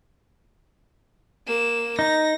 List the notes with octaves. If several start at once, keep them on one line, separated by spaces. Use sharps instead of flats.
A#3 E7
D#4 A#6